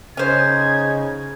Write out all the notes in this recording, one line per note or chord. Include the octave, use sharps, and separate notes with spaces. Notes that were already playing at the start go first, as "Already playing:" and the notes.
C#3 C#4 D#4 C5 G#6